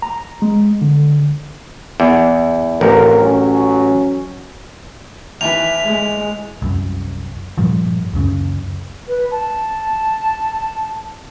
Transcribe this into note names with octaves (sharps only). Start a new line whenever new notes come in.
A#5
G#3
D3
E2
A1 F2 F4 A#4
F#3 C#4
D#2 E3 E5 F7
G#3
C2 F#2
G2 A#2 F3 G3
C#2 F#2 C#3
B4
A5